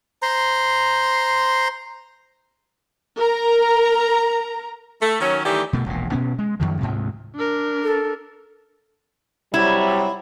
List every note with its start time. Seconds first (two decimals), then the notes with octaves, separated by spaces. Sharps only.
0.22 C5 A#5 C6
3.16 A#4 A#5
5.01 A3
5.20 D#3 F#3 C#4
5.44 D#3 E3 G3 A3 G4
5.73 B2 A3
5.86 E1 A#1 A#2
6.12 B2 B3 C#4
6.39 G#3
6.60 F#2 A#2 D#3 F3
6.81 D2 G#2 C3
7.35 D4 A#4
7.84 A4
9.54 C3 F#3 G3 E4